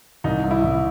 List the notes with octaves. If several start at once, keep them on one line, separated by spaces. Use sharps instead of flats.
C2 D#4
C2
E4
C2